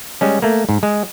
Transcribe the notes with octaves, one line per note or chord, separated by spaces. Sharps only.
G3 G#3 C#4
A3 A#3
G#2
G#3